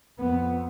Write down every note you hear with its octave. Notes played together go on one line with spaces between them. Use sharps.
F2 B3